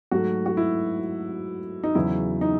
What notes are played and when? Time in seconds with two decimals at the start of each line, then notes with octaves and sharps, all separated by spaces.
0.11 G#2 F#3 A3 F#4
0.46 F#4
0.57 E4
1.84 D#4
1.95 E2 C#3 F#3 E4
2.41 D#4